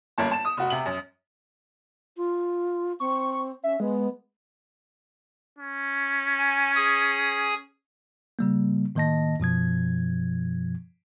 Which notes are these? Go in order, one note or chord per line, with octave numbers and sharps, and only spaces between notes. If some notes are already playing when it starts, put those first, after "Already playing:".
G1 F#2 A#3 A5
A5 E7
D#6
F1 F#4
C3 F#7
F#2
F4
C4 C#6
C#4 E5
G#3 B3
C#4
G#5
G#4 G#5 D#6
C#3 G3 A#3
A2 D#3 A#3 D#5 A5 A#6
F#2 B2 F3 G#6